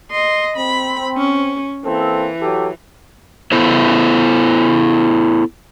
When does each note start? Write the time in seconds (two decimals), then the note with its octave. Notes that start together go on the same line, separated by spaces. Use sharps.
0.11 D#5 C6
0.56 C4 B5
1.18 C#4
1.85 E3 A#3 C4 A4
2.41 F#3 G4 A4
3.52 B3 E4 A4 C5